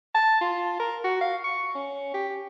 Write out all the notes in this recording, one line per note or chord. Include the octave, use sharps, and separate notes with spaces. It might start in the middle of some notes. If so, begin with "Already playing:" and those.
A5
F4
A#4
F#4
F5
C#6
C#4
G4